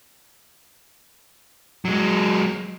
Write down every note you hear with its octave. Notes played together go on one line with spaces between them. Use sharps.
F#3 G#3